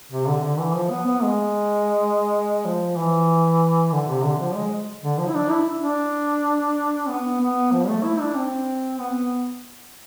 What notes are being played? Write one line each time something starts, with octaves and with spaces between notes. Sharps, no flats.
C3
D3
D3
E3
F3
B3
B3
G#3
F3
E3
D3
C3
D3
F3
G#3
D3
F3
E4
D4
E4
D4
B3
B3
F3
A3
E4
D4
C4
B3